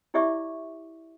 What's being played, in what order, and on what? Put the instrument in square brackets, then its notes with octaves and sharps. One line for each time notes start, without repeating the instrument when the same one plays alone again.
[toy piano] E4 G4 D5 E5 C#6 D6